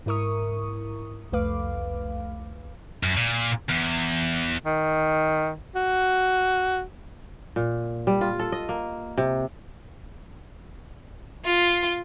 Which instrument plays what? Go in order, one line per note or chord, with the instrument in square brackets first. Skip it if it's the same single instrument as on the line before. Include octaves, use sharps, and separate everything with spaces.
[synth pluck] G#2 E4 A#4 C#6 D#6
C2 F2 A3 B4 F5 D6
[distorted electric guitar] F#2
A#2
E2
[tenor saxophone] D#3
F#4
[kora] A#2
G3
F4
A4
D#5
A#3
C3
[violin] F4